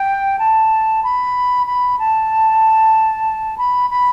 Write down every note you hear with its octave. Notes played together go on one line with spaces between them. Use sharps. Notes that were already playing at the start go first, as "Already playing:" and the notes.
Already playing: G5
A5
B5
B5
A5
B5
B5